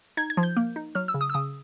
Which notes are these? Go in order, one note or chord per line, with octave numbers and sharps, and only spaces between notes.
D#4 G#6
G#6
F3
G6
A#3
D#4
F#3 F6
E6
C#3
D#6
E6
C#3 D#6